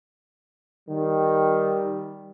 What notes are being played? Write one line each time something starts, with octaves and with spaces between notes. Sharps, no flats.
D#3 G3